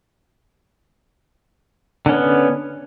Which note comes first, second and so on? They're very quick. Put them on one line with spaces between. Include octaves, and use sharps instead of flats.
D3 C#4 B3